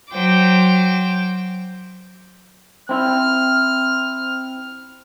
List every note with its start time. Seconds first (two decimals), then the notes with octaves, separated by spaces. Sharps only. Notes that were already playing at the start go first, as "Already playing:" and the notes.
0.11 F#3 C5 G5 D6
2.89 C4 E4 F6